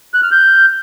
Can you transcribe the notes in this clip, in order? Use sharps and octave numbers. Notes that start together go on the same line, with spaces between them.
F#6
F6
G6